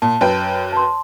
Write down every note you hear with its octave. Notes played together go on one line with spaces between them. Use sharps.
A#2 A5
F#2 B4 G5
A5 C6